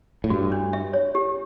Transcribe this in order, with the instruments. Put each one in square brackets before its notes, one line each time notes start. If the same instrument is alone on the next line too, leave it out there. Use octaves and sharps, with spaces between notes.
[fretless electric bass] A2
[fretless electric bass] G2 [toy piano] F#4
[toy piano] D4
E5
C#5
G4